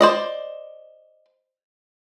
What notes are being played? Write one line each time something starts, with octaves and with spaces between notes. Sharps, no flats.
C5 D5 D#5